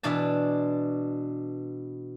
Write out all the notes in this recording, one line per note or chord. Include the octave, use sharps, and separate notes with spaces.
B2 E3 D4 A5